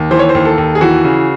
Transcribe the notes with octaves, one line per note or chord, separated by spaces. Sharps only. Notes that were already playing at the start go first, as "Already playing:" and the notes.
Already playing: D#2
E3 C5
C#5
C5
D#2
A4
D#2
G#4
E3 F#4
C#3